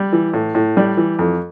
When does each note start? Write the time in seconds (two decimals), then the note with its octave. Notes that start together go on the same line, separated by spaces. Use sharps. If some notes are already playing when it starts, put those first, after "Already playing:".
Already playing: G3
0.13 E3
0.33 A2
0.55 A2
0.77 G3
0.97 E3
1.19 F2